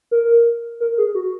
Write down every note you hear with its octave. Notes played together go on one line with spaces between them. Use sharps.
A#4
A#4
G#4
F#4